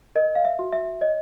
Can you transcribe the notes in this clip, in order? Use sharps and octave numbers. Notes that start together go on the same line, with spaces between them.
A#4 D#5
F5
E5
F#4
E5
C#5 D#5